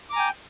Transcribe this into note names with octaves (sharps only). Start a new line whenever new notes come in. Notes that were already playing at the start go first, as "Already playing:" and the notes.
G5 G#5 A#5 D6